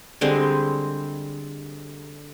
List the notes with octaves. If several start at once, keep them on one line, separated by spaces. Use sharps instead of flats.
D3 G3 G#3 C4